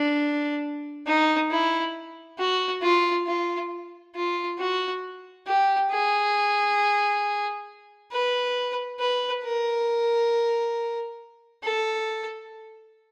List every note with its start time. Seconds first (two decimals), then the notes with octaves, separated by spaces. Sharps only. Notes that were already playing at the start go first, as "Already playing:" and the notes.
Already playing: D4
1.06 D#4
1.50 E4
2.38 F#4
2.82 F4
3.27 F4
4.15 F4
4.58 F#4
5.46 G4
5.91 G#4
8.11 B4
8.99 B4
9.43 A#4
11.63 A4